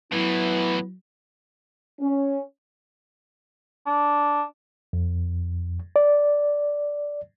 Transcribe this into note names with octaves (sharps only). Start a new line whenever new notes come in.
A2 E3 F#3 B3 E4
C#4
D4
F2
D5